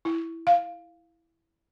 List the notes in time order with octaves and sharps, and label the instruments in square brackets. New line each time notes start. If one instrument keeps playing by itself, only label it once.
[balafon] E4
F5